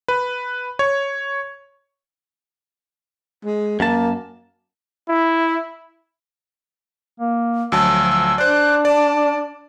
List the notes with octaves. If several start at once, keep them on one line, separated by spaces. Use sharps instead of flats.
B4
C#5
G#3
F#2 A#3 A5
E4
A#3
D2 F3 F#3 A5 E6
D4 C5 D5 F#6
D5 A5